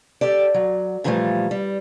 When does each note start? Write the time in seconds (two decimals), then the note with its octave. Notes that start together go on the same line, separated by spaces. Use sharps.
0.21 G4 A4 D5
0.54 F#3
1.04 A#2 D3 E3 F3 G3 A3
1.51 G3